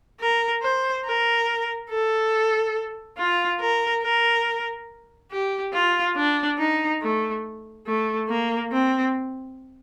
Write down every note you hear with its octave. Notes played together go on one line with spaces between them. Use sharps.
A#4
C5
A#4
A4
F4
A#4
A#4
G4
F4
D4
D#4
A3
A3
A#3
C4